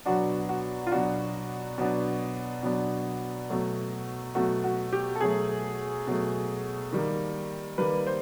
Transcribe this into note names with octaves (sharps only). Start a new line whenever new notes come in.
B2 F#3 B3 D4 F#4
F#4
F4
B2 F#3 B3 D4 F#4
B2 F#3 B3 D4
B2 F#3 B3 D4
B2 F#3 A3
B2 F#3 A3 F#4
F#4
G4
A4
B2 F#3 A3 G#4
B2 F#3 A3
D#3 G3 A#3
D#3 G3 A#3 B4
C5